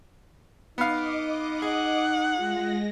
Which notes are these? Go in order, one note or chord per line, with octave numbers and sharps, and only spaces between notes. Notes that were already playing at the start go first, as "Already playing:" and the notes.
B3 D#4 D#5 F5 D6
G#4 F#5
G#3 F4 A#6